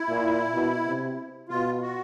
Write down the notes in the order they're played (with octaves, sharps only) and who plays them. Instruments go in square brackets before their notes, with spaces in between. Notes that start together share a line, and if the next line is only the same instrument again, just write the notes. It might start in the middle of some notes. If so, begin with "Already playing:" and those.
Already playing: [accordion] E4
[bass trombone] A#2
B2
C3
[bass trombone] B2 [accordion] F4
[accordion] F#4